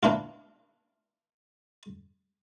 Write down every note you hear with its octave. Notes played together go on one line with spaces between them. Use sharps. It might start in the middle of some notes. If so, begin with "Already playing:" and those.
A#3 D4 E4 F4